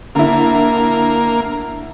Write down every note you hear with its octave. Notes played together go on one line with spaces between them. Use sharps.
D3 A#3 E4